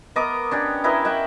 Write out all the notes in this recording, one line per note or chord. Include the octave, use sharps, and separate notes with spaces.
B3 A#4 D#5 D6
C#4 D4 G4 G5
E4 A#4 B4 D#5
D#5 E5 F#5 G5